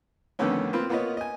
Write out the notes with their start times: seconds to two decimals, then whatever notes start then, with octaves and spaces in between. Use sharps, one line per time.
0.39 F2 D3 D#3 A3 B3 C#4
0.73 A#3 C4 F4 B4
0.89 A#3 B3 F4 B4 C#5 D#5
1.17 D#5 G#5